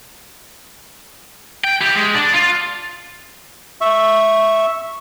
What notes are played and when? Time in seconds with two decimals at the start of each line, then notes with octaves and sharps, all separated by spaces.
1.64 G5
1.81 E4 G4
1.96 G#3
2.14 D4
2.33 F4
3.81 E5 C#6